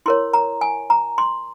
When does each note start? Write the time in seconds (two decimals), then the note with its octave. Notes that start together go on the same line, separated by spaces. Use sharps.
0.06 E4 A#4 C#5 C6
0.33 A#5
0.61 G#5
0.90 A#5
1.18 C6